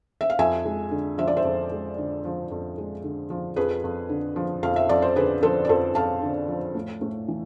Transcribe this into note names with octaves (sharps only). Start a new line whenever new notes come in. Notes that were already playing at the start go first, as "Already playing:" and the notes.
E5
F5
F2 E5 G#5
G#3
D3
F3 E5
D5
C5 E5
F2
G#3
D3
F3
F2
G#3
D3
F3
F2 G#4 B4
F2
D3
F3
F2 F5
E5
F2 D5
C5
D3 G#4 B4
F3 A4 C5
D5
F2 A4 C5
F2 F5 A5
D3
F3
A2
A2
E3